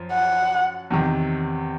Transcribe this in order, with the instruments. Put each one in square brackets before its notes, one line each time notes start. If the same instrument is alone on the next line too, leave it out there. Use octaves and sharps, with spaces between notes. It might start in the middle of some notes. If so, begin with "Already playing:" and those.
Already playing: [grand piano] F#2 F3
[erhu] F#5
[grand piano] E2 C3 D#3